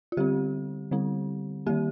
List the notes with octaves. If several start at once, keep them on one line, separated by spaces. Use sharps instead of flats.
F4
D3 G3 C4 G4
D3 G3 C4
D#3 G3 A#3 G4